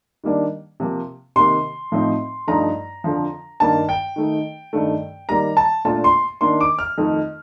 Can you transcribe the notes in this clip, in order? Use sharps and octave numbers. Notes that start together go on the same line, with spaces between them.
D#3 G3 A#3 D4
C3 F3 A#3
C3 D#3 A#3 C6
A2 F3 C4 D#4
G2 F3 A3 D#4 A#5
F2 D3 F3
G2 D#3 A#3 A5
G5
D#3 A3 D#4
G2 D#3 A3
D#3 G3 A#3 A#5
A5
A#2 A3 D4 F4 A5
C6
D#3 A#3 D4 C6
D6
F6
F2 D#3 A3 D#4